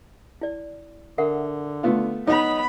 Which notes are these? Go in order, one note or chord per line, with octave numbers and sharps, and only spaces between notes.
E4 D5
D3 A#4 E5 F#5
A3 B3 F4
B3 D#4 C#5 D#5 B5